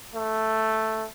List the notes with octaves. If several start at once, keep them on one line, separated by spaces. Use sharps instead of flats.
A3